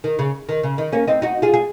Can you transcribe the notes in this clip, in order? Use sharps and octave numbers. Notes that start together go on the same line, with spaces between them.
D#3
C#3
D#3
C#3
D#3
A#3 C#4
C4 D#4
D#4 F#4
F4 G#4
G#4